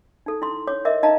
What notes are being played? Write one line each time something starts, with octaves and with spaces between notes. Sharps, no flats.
D#4 A4
E4 C6
C#5 D6
A#4 D#5 E5 D6
D#4 D#5 F5 A5 A#5